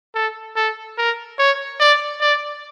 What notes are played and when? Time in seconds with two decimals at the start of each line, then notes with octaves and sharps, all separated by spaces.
0.15 A4
0.56 A4
0.98 A#4
1.39 C#5
1.80 D5
2.21 D5